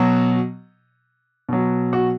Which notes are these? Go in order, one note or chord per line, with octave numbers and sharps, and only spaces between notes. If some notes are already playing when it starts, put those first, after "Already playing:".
Already playing: B2 F#3 F#4
B2 F#3
F#4